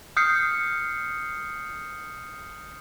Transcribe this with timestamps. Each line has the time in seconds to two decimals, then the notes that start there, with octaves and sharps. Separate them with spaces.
0.17 D#6 F6 G6 C7 C#7